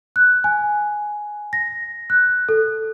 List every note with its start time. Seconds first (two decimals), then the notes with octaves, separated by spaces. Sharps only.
0.16 F#6
0.44 G#5
1.53 A#6
2.10 F#6
2.49 A4